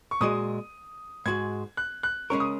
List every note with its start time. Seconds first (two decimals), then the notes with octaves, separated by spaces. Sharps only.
0.11 C#6
0.21 A#2 G#3 F#4 D#5 D#6
1.26 G#2 G#3 F#4 G#6
1.77 F#6
2.03 F#6
2.30 C#3 G#3 C#4 A#4 C#6
2.40 D#6